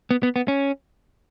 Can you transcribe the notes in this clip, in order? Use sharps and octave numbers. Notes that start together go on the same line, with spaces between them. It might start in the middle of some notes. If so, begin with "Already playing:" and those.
B3
B3
B3
C#4